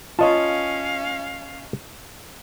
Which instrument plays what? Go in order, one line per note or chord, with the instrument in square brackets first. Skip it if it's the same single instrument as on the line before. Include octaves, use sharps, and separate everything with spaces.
[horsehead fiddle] C#4 F5 [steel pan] F4 [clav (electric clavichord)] C#5 D#5 A5